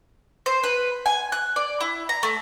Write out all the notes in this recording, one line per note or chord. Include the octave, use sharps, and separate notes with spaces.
C5
B4
G#5
F#6
D5
E4
A#5
A3